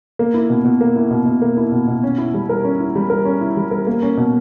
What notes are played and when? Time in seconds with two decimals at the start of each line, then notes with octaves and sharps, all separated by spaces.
0.19 A#3
0.34 E4
0.50 B2
0.65 B2
0.81 A#3
0.96 E4
1.11 B2
1.26 B2
1.42 A#3
1.57 E4
1.72 B2
1.87 B2
2.03 C#4
2.18 E4
2.34 G3
2.49 A#4
2.64 C#4
2.80 E4
2.95 G3
3.10 A#4
3.25 C#4
3.41 E4
3.57 G3
3.71 A#4
3.87 A#3
4.03 C#4
4.17 B2